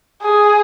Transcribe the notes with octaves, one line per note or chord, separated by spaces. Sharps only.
G#4